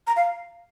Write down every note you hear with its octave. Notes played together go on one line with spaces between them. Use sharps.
A#5
F5